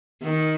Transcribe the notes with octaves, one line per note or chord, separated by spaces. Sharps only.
D#3